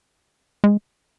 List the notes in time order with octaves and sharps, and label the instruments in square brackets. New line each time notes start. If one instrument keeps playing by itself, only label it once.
[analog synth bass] G#3